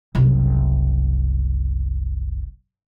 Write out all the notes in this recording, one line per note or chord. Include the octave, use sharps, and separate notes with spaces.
F#1 C2